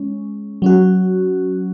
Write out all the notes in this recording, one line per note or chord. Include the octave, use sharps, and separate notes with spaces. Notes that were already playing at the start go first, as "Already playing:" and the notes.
Already playing: G#3 C#4
F#3 C#4 F#4